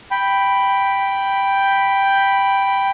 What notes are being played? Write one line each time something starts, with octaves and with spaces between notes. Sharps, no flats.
G5 B5